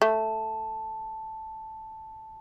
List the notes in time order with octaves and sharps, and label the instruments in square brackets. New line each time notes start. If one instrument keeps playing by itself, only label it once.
[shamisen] A3 [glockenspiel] A5